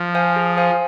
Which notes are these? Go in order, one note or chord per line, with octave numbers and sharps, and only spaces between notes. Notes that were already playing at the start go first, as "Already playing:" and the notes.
Already playing: F3
C5 F5 G#5
G#4
C5 F5 G#5